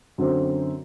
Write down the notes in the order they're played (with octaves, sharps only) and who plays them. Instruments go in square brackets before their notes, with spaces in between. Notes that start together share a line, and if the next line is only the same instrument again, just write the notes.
[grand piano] F#2 D3 C4